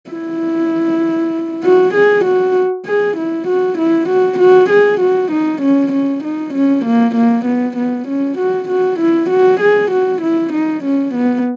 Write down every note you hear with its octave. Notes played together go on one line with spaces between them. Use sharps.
E4
F#4
G#4
F#4
G#4
E4
F#4
E4
F#4
F#4
G#4
F#4
D#4
C#4
C#4
D#4
C#4
A#3
A#3
B3
B3
C#4
F#4
F#4
E4
F#4
G#4
F#4
E4
D#4
C#4
B3